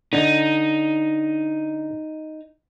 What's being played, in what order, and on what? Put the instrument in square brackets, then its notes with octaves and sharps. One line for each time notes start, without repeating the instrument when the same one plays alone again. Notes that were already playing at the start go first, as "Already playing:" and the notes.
[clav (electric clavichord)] D3 [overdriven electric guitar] D#4